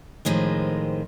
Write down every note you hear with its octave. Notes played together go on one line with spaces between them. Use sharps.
A2 D#3 F3 G#3 C4